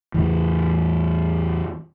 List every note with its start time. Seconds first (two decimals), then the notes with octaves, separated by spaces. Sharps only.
0.14 E2 A2 E3